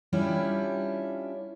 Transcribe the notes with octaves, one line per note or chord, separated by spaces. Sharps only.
G3 C#4 D4 E4 F4 G4